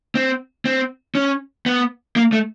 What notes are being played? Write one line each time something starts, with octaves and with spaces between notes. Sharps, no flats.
C4
C4
C#4
B3
A#3
A3